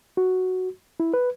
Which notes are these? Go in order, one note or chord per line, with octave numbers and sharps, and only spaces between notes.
F#4
E4
B4